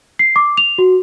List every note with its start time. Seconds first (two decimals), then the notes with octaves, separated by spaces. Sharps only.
0.19 C7
0.36 D6
0.57 F7
0.78 F#4